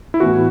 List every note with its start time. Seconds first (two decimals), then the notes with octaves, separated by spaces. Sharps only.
0.14 E4
0.20 A2 E3 B3 F#4